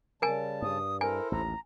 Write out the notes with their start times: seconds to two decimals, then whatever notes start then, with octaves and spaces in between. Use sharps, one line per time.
0.22 C#3 G3 A#4 G#5 A5
0.62 G2 D#6
1.01 E4 A4 A#4 C5 G#5
1.32 A1 D#2 A#5